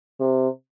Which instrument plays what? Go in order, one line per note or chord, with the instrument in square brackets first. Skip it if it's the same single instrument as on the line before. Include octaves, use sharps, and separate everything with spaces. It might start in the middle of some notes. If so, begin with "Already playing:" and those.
[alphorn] C3